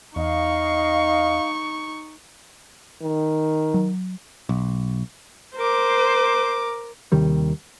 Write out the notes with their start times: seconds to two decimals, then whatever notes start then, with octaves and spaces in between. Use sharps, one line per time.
0.16 E2 D#4 D#5 F5 C#6
3.03 D#3
3.74 F#3
4.49 B1
5.57 A#4 C5 D6
7.12 D#2 C3 D#3 G3